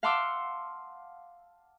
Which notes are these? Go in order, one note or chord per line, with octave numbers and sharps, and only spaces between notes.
F5 F#5 A5 C6 D6 E6